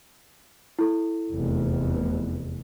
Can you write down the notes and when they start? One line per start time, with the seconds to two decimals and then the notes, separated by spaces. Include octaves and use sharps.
0.79 E4 A4
1.31 F1 E2